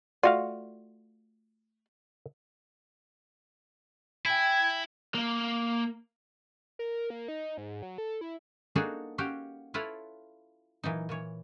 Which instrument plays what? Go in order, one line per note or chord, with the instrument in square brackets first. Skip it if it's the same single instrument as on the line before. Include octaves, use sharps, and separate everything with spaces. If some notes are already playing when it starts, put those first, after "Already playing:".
[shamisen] A3 D5 [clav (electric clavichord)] F4 F#4 F5
[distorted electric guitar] E4 [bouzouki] G5 G#5 [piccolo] G#6
[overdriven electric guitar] A#3
[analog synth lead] A#4
A#3
D#4
G#2
F#3
A4
E4
[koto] A#3 D4 D#4 F#4 G#4 A4
C#4 F#4 G4 F5 G5
E4 F4 A4 B4 C#5 F5
A#2 E3 F#3 D#4
A#2 E3 C#5